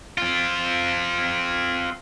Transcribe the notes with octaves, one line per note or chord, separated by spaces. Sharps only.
C4 F4